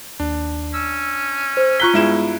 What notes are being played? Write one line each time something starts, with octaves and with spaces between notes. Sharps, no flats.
D#2 D4
C#4 E6
C5
F4 A#5 C#6 F#6 B6 G7
G2 G#3 B3 E4 G#4 E7